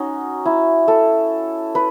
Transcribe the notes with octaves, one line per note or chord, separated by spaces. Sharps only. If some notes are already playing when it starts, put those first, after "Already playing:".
Already playing: C#4 D#4 F#4
E4
A4
B4